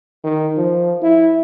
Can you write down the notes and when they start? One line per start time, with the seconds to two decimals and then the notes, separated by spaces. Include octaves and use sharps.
0.24 D#3
0.57 F3
1.02 E4